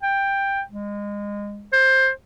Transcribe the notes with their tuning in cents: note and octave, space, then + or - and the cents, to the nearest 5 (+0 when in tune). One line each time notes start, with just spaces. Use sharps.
G5 +10
G#3 -25
C5 +15